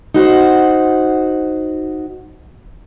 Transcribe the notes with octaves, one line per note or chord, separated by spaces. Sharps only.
D#4 F#4 C5